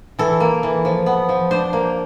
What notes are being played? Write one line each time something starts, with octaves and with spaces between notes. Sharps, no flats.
E3 A4
A#3
E3
F3
B3
F3
D4 C5
A#3